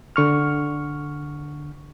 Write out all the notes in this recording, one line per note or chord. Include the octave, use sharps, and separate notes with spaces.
D3 C#6 F6